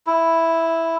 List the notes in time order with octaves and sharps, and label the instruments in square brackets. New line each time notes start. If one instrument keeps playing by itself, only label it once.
[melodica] E4